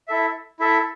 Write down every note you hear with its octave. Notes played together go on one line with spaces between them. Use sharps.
E4 A4 E5
E4 A4 E5